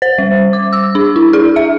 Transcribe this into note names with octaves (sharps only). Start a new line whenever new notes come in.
C5
G3
D6
E6
D4
E4
G#4
E5